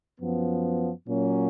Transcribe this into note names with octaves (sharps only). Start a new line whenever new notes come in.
F#2 F3 B3
A#2 F#3 A#3 C#4